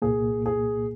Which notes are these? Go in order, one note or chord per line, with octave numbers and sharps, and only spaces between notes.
C2 A#2 A#3 G#4
G#4